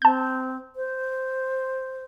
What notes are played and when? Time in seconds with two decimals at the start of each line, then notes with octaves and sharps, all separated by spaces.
0.02 C4 A5 G6
0.76 C5